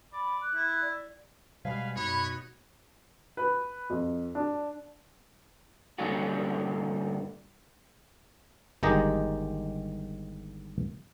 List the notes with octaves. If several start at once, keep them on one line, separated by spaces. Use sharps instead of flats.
D5 B5
F#6
E4
D5
B2 G3 G#3 B4 F5 G#5
F#2 B2 D#4 F#4 C#5 B5
B4
F2
D4
G2 A#2 D3 C#4 F4 F#4
G1 D#3 G#3 G4 D#5 A#5